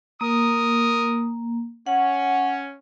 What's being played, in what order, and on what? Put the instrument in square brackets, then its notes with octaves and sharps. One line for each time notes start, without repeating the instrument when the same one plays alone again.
[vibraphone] A#3 [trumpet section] A#4 D#6
[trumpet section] C#4 [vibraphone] F#5